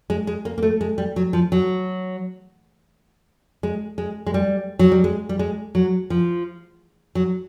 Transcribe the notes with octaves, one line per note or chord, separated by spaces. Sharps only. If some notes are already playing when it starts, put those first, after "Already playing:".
G#3
G#3
A#3
A#3
A3
G#3
G3
F#3
F3
F#3
G#3
G#3
G#3
G3
F#3
G3
G#3
G3
G#3
F#3
F3
F#3